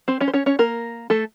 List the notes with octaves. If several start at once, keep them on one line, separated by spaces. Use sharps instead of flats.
C4 C5
C#4 C#5
C5
C#4 C#5
C#4 C#5
A#3 A#4
A3 A4